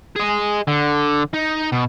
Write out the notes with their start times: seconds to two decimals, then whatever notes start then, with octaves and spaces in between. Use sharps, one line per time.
0.16 G#4 D#5
0.68 D3
1.34 D#4
1.72 B2